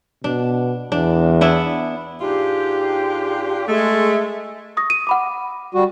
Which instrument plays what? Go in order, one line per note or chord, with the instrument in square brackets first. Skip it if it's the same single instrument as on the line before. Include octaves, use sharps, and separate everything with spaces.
[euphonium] B2 [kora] D4
[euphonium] E2 [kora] D4
[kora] B3 D4 E4
[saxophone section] G#2 D4 F4 G4
G#3 A3
[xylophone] C#6 D#6 A#6
D#7
F#5 B5 D6
[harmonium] G3 F#4